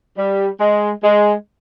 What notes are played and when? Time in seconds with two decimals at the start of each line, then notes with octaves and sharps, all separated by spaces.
0.17 G3
0.60 G#3
1.03 G#3